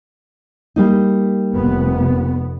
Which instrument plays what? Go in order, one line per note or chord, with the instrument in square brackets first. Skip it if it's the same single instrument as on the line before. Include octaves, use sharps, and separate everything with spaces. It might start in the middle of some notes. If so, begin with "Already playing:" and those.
[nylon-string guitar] G3 A#3 D#4
[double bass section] F1 B3